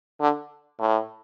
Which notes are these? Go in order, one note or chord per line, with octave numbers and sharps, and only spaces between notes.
D3
A2